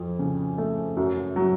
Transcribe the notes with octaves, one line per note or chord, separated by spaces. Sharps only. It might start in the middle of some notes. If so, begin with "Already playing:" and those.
Already playing: F2 F3
C#3
A3
F#2
F#3